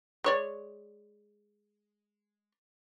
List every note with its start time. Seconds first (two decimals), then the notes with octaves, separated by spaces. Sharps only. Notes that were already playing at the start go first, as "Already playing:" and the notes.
0.24 G#3 C#5 D5